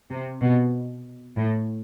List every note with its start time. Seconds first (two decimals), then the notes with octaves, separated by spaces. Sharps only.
0.10 C3
0.42 B2
1.36 A2